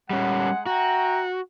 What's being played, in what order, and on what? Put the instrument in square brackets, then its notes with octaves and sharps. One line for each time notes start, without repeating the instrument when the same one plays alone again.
[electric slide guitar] G3 C#4 [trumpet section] G#3 F#5
[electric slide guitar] F#4 [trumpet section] E5 G5 A#5